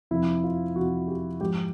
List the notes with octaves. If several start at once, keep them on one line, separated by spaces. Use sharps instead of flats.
F2 C3 F3 E4
F4
F2 C3 F3 F#4
G4
G#2 F3 G4